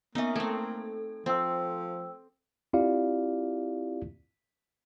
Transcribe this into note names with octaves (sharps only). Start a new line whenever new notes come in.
A#3 B3 C#4 D#4 E5
A3 C4 A4
F3 C4 C5 G5 E6
C4 E4 F4 G4 D5 F5